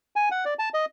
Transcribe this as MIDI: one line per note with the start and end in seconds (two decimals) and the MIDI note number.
0.16 0.29 80
0.31 0.45 78
0.45 0.54 74
0.59 0.69 81
0.74 0.85 75